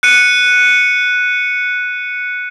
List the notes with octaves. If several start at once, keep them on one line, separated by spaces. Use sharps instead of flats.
F#6 C#7 D#7